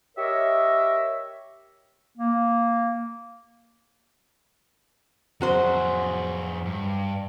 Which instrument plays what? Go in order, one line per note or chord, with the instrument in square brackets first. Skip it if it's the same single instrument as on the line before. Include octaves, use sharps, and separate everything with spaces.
[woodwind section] G4 A#4 C#5 D#5 E5
[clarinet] A#3
[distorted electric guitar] F2 G#4 [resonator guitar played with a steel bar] F#3 F#4 C5
[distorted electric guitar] G2